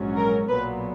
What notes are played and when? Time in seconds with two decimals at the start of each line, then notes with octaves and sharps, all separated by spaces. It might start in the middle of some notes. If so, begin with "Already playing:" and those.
Already playing: A#1 G#2 F#3 C#4
0.17 A#4
0.48 B1 A#2 F#3 B3 B4